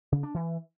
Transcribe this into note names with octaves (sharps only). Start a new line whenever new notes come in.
C#3
D4
E3